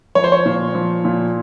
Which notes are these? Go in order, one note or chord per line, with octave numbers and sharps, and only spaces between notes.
F3 C#5
C5
C#5
A#2
F3
A#2